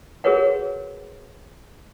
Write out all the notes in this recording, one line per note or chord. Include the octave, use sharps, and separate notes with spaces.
F#4 G#4 A#4 B4 C#5 F#5